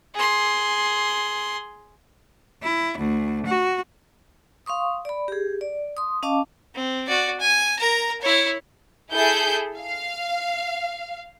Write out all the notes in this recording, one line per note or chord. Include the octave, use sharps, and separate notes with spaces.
G#4 C6
E4
D2
F#4
F5 C6 C#6 D#6
D5 B5
G4 G#4
D5
C6 D#6
C#4 D#5 F5 A5 D6
C4
F#4 D5
G#5
A#4 A#5
E4 C#5
E4 G#4 A4 G6
F5